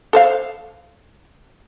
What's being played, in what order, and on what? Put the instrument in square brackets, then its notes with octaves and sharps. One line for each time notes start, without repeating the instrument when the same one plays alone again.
[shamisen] A4 C5 F5